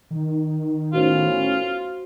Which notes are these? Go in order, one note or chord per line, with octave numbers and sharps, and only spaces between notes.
D#3
A2 B3 C#4 F4 F#4 C5